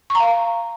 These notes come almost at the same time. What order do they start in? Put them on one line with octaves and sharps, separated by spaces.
C#6 A#5 F5